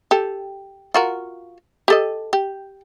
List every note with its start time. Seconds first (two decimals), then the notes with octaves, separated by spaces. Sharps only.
0.11 G4 A4
0.94 F4 F#4 A#4
1.88 G4 A4 D#5
2.33 G4